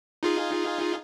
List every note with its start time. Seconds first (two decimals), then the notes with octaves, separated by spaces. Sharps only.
0.23 D#4 F4 G#4